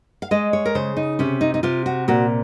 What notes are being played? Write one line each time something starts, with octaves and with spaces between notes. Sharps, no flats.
F5
G#3 D#5
C#5
A#4
C#3 C5
D#4
C3 C#4
D#4
D#4
C3 F4
F#4
A#2 F#4